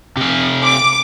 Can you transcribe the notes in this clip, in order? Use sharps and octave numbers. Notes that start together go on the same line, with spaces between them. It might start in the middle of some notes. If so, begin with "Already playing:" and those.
C3 F5
D6